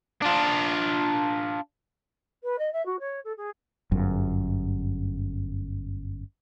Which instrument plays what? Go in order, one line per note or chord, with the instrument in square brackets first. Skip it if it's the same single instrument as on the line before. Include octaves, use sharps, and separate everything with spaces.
[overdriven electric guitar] D4 F4
[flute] B4
D#5
E5
F#4
C#5
A4
G#4
[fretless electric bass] G1 F#2